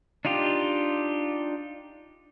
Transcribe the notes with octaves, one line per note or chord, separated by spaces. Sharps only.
D4 D#4 F4 G4